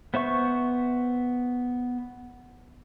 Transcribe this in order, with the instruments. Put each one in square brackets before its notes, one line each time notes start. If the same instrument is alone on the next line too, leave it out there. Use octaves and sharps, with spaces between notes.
[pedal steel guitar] B3 C5 E5 C#6